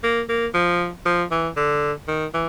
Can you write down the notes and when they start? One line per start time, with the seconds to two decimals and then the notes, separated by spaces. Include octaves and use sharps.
0.03 A#3
0.29 A#3
0.54 F3
1.06 F3
1.31 E3
1.56 D3
2.08 D#3
2.34 E3